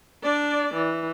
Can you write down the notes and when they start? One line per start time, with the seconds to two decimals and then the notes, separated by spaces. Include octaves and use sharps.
0.23 D4 D5
0.74 E3